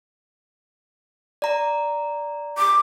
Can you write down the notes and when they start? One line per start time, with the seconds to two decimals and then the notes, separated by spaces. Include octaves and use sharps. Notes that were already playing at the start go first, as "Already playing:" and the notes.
1.42 D5 A#5
2.58 D6